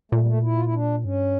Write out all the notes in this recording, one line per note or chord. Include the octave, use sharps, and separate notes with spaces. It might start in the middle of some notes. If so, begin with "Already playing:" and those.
A#2 A3
G3
A3
E4
F4
E4
D4
G2 C#4